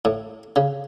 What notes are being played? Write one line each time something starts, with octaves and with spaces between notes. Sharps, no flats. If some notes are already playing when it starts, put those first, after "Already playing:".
A2
C#3